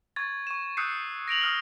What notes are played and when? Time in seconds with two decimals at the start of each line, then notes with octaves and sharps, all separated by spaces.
0.16 C#6 G#6 A6
0.47 C#6 E7
0.77 D#6 E6 F#6 G6 C7 C#7
1.28 A#6 D7 F7 F#7
1.41 D#6 F6 G7